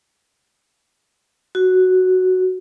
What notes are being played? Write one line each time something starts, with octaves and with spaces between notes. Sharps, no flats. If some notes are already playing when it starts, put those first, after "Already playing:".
F#4